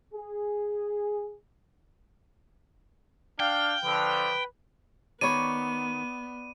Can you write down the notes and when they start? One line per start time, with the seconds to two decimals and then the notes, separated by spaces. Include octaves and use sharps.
0.13 G#4
3.40 D4 F5 G5
3.85 D3 F3 B4
5.21 D#3 B3 C#5 D5 B5 D#7